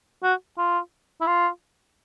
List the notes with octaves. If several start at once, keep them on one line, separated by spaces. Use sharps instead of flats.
F#4
F4
E4
F4